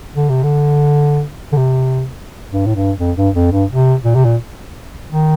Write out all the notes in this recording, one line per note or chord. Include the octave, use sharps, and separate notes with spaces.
D3
C3
D3
D3
C3
G2
A2
G2
F2
G2
F2
G2
C3
A#2
C3
A#2
D#3